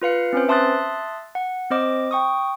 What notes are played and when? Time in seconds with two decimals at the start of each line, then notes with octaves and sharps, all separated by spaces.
0.02 F4 B4 F5 C#7
0.33 C4 C#4 B4 C5
0.48 E5 A5 C6 D#6 F#6 A6
1.35 F#5
1.71 C4 C5 D#5 D6
2.11 G5 C#6 D#6